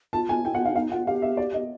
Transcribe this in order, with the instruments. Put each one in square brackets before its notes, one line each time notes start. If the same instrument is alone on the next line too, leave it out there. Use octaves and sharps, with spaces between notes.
[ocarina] F4 [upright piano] A5
[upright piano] G#5
[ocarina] E4 [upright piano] G5
[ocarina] F4 [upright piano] F#5
[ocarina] D#4 [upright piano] F5
[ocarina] D#4 [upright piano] F5
[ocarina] F4 [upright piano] F#5
[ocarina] G4 [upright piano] F5
[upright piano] E5
D5
D#5